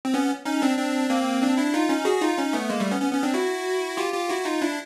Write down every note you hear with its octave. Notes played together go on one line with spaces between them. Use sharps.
C4
B3 C#4
C#4 D#4
C4 D4
C4 D4
A#3 C4
C4 D4
D4 E4
D#4 F4
C#4 D#4
F#4 G#4
D#4 F4
C#4 D#4
A3 B3
G#3 A#3
G3 A3
B3 C#4
B3 C#4
B3 C#4
C4 D4
E4 F#4
F4 G4
F4 G4
E4 F#4
D#4 F4
D4 E4